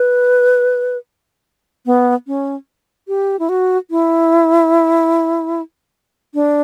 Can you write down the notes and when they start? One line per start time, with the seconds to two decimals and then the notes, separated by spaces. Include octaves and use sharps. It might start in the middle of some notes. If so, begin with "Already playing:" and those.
Already playing: B4
1.86 B3
2.27 C#4
3.08 G4
3.39 E4
3.49 F#4
3.91 E4
6.34 D4